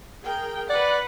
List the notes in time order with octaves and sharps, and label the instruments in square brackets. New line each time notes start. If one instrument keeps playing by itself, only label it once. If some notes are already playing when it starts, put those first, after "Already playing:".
[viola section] G#4 A#4 G5
[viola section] B4 F#5 [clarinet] D5